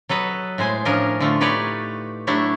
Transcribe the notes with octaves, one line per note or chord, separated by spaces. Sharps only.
F#3 A4 B4 D#5
A2 G#3 C5 G#5
A2 F3 C#4 D4 A#4 D#5
D3 A3 F4
D#4 G4 B4 C#5 D5
F#3 A3 D4 E4 F#4 G4